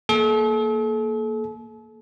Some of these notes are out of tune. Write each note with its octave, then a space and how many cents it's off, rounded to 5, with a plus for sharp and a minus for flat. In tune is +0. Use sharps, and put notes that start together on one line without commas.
A#3 +0 A4 -40